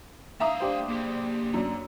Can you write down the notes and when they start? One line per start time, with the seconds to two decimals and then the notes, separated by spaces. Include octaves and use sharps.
0.40 A3 E5 F5 A#5 D#6
0.60 D4 G4 C5
0.88 A#3 G#4
1.54 F#2 D4